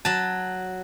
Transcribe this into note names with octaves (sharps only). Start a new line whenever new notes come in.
F#3 A5